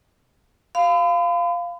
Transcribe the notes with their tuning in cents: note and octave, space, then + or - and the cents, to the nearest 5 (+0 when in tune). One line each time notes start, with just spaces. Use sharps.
F5 -5 B5 +40